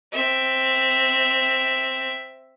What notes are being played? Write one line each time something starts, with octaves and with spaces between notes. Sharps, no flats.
C4 E5